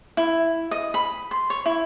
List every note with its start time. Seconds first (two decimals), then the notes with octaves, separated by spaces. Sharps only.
0.17 E4
0.71 D#5
0.94 B5
1.31 C6
1.50 C#5
1.66 E4